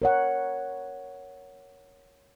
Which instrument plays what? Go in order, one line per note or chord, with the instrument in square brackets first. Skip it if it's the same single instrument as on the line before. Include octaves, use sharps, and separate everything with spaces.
[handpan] A#4 C#5 F#5